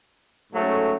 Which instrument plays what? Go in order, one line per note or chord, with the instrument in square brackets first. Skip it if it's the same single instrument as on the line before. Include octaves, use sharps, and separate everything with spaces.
[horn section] G#2 F#3 A3 C#4